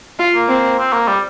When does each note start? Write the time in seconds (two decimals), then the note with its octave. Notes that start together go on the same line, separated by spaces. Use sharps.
0.19 F4
0.35 A#3
0.48 C4
0.79 C4
0.93 A#3
1.08 G3